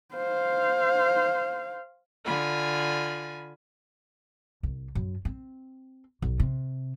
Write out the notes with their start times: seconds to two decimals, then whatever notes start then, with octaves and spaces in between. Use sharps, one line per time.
0.14 C5 F5
2.25 D3 F4 G#5 B5
4.63 C2
4.95 F#2
5.25 C4
6.22 B1
6.40 C3